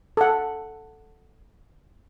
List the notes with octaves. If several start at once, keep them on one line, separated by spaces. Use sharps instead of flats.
A4 F#5